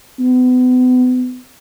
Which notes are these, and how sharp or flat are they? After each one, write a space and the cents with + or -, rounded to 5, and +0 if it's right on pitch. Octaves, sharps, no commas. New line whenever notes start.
B3 +35